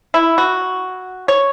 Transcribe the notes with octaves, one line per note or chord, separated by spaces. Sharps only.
E4
F#4
C#5